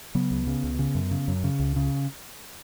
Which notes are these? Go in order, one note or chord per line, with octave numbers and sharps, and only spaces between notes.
C#3 F#3 B3
C#2
C#3
C#2
C#3
F#2
C#3
F#2
C#3
C#2
C#3